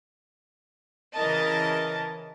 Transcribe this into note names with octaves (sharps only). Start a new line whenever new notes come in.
C#3 E3 A#4 D#5 A5